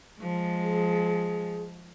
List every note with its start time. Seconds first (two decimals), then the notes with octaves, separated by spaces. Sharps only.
0.21 F3 G#3
0.63 G#4